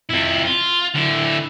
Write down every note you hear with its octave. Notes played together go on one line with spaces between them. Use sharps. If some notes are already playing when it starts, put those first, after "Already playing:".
F2 E4
F4
D3 E4